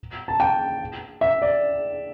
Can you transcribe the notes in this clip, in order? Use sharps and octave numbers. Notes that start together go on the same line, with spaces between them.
A5
G5
E5
D5